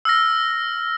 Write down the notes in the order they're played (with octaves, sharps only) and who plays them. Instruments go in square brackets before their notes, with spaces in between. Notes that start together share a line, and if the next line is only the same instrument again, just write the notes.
[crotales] E6 F6 A#6